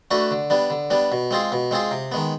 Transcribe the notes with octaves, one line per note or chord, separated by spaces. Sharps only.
A3 D4 F#4 B4
D3
G3 B3 D4
D3
G3 B3 D4
B2
G#3 C4 F4 G#4
B2
G#3 C4 F4 G#4
C3
D#3 G#3 B3